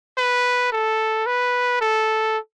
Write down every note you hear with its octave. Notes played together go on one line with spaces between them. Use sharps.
B4
A4
B4
A4